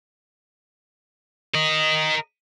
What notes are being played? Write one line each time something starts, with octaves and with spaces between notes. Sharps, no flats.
A#4 D#5